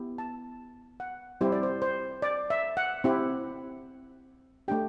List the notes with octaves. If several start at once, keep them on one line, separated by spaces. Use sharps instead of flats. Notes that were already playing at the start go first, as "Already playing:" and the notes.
Already playing: B3 E4 G4
A5
F#5
G3 C4 E4 G4 C5
D5
C5
C5
D5
E5
F#5
C4 E4 G4
A3 D4 G4 G5